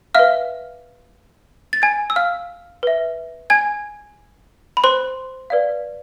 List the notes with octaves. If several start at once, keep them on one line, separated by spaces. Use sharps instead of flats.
B4 E5 F5 F6
A6
G#5 G#6
E6
F5 F6
B4 E5
G#5 G#6
B5
C5 C6
B4 D5 F5